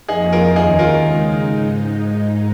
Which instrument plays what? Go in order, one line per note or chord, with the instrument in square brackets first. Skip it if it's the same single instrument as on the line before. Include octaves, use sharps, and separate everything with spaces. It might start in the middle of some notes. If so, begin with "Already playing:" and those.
[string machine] F2 F3 A#3 [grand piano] D#4 G#4
[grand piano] F4 A#4
[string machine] D#2 D#3 C#4 [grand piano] D#4 G#4
[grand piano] F4 A#4
[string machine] C#3 G#3 D#4
G#2 G#3 D#4